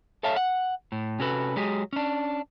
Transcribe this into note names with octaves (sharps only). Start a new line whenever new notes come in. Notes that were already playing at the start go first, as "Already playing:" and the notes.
A4 C#5 E5 F5 A5
F#5
A2
C3 C#4 F#4 A4 B4
F#3 G#3 G4 G#4
C#4 D4